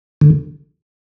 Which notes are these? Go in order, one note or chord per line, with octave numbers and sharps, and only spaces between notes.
D3